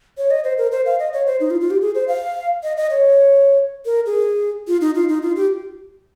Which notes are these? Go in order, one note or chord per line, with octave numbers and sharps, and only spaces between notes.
C#5
D#5
C5
A#4
C5
F5
D#5
C#5
C5
D#4
F4
F4
G4
G#4
C5
F5
D#5
D#5
C#5
A#4
G#4
F4
D#4
F4
D#4
F4
G4